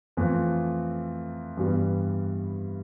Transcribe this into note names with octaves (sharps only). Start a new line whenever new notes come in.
F2 E3 A3 C4 F4
G2 E3 G3 B3